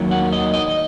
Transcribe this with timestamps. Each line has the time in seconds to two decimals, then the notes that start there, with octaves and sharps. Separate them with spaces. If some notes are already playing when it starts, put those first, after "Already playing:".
Already playing: D#2 D#3 F#3 A#3
0.11 F#5
0.33 D#5
0.54 D#5